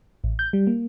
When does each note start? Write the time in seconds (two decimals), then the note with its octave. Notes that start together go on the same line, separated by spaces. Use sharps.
0.24 A1
0.39 G6
0.53 G3
0.67 A#3